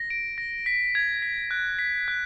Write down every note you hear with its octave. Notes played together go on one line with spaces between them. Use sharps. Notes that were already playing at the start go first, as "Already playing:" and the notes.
Already playing: A#6
D7
A#6
B6
G#6
B6
F#6
B6
F#6